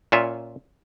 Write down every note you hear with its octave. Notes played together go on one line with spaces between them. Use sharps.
A#2 C#4 F4 E5